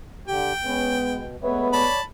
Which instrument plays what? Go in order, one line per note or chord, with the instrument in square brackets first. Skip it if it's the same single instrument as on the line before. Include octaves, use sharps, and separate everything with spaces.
[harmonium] D3 G4 [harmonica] G5
[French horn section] G#3 B3 [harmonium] C#4
[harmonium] B2
[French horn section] G#3 A3 B3 [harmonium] B4 C#5 E5
[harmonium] C#5 D5 [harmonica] A5 B5